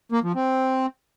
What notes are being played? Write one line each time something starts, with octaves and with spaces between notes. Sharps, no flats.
A#3
F3
C4